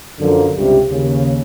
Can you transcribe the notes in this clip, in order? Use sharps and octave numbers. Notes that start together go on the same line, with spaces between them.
F#2 D3 F3 A#3
C#2 G2 C3 G3
D#2 C#3